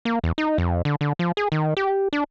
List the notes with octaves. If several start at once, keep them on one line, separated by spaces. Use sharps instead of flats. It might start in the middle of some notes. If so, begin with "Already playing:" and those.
A#3
E2
D#4
F2
D3
D3
F3
G#4
D#3
G4
D4